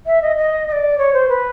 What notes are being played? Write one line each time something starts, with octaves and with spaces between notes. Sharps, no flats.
E5
D#5
D#5
D#5
D5
C#5
C5
B4